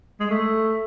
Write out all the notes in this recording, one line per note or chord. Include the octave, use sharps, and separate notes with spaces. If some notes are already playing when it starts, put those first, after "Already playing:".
G#3
A3